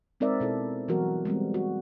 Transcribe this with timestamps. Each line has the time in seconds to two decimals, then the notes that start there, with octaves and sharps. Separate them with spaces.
0.20 G#3 C4 D#4 A#4 D5 E5
0.40 B2 E4 A4
0.88 E3 F#3 G3 B3 F#4 A#4
1.25 G3 G#3 B3 C4
1.54 F#4